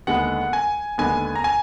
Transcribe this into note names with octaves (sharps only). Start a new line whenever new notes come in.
D#2 D3 G#3 B3 F#5
G#5
D#2 D3 G#3 B3 G#5
A#5
G#5